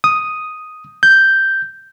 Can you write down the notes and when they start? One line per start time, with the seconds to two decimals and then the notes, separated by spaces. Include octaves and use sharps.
0.04 D#6
1.03 G6